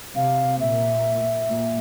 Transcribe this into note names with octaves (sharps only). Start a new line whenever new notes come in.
C3 F5
A#2 E5
A#2